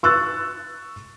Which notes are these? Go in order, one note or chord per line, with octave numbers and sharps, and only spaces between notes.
C#6 E6 F#6 A6